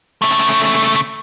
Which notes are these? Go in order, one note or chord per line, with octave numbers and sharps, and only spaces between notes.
C#3 A3